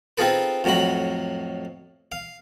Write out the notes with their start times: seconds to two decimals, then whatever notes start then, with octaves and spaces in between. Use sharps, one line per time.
0.18 C4 D#4 F4 G#4 A4 B4
0.64 F2 A2 F#3 F#4 B5
2.12 F5